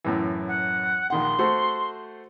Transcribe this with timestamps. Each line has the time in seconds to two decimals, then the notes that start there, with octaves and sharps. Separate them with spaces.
0.05 F#2 A2 E3
0.47 F#5
1.10 A#1 D#3 F#5 C6
1.39 A3 F#4 C5